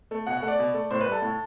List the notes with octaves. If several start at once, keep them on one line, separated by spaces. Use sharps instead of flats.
A3
B2 F#5
F#5
A3
D5
B2
A3
A2 C5
B4
G3
A4
A2